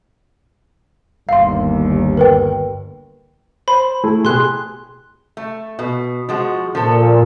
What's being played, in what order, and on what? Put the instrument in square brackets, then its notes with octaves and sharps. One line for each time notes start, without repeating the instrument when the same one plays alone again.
[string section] G1 D#2 [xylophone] F5 C6
[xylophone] A#4 B4 G5
[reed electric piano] C5 [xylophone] B5
[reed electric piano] A3 E4 G#4
[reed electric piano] B2 G4 G#4 [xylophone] C6 F#6
[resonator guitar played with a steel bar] A3
B2
F3 G#3 F#4
[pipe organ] A#2 [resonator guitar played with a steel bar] F3 A4